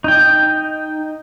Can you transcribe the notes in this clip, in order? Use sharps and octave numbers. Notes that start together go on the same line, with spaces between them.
D#4 G5